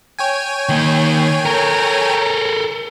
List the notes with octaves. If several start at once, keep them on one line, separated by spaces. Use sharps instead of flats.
C#5 G5 G#5
D#3 A#3
A4 A#4